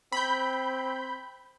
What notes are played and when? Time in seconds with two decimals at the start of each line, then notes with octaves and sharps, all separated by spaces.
0.12 C4 B5 G6